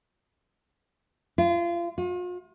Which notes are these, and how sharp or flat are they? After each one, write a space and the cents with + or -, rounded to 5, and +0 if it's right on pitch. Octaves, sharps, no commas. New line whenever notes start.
F4 -30
F4 +45